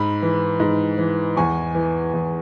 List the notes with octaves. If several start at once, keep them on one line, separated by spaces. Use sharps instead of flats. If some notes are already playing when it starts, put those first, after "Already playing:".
Already playing: G#2 B5
E3
G#2
E3
E2 G#5 C#6
E3
E2